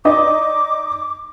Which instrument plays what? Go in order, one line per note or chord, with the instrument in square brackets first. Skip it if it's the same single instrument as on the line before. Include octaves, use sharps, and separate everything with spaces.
[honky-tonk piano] D#4 D5 D#5 [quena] D6